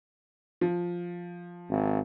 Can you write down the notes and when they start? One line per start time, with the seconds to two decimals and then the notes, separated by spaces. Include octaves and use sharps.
0.61 F3
1.69 G#1